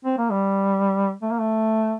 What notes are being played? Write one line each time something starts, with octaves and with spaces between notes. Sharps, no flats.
C4
A#3
G3
A3
A#3
A3